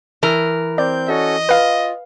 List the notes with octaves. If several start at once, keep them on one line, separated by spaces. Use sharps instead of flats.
E3 A#4
C4 D5 G6
C#4 F#4 A4 D#5
F4 B4 F5